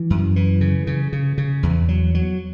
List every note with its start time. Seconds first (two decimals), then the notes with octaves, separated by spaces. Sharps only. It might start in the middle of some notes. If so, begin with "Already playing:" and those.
Already playing: E3
0.10 F#2
0.36 E3
0.61 C#3
0.87 C#3
1.13 C#3
1.38 C#3
1.63 E2
1.89 F#3
2.15 F#3